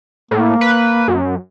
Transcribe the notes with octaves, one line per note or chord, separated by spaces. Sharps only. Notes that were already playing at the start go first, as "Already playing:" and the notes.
A2 A#3
B4
F#2